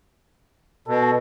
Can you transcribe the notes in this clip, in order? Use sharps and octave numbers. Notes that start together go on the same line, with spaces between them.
B2 A4